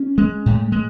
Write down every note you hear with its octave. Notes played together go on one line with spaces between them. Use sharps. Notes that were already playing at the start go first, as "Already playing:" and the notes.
Already playing: C#4
G#3
A2
G#3